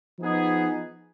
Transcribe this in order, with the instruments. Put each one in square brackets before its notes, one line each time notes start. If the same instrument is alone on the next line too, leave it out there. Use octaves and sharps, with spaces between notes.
[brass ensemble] F3 B3 D#4 G#4